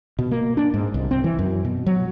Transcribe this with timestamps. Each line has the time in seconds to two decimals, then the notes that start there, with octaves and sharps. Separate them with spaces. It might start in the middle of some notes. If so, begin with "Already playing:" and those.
0.19 B2
0.31 A#3
0.57 D4
0.74 G#2
0.94 C2
1.11 C4
1.24 E3
1.39 F#2
1.65 B2
1.86 F#3